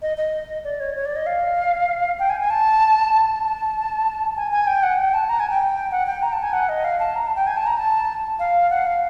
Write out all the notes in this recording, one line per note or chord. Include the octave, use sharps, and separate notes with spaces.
D#5
D#5
D5
C#5
C#5
D5
D#5
F5
G5
G#5
G#5
A5
A5
G#5
G#5
G5
F#5
G5
A5
A#5
G#5
G5
F#5
G5
A#5
A5
G#5
F#5
D#5
F5
A5
A#5
A5
G5
G#5
A5
A#5
A5
F5
F#5
F5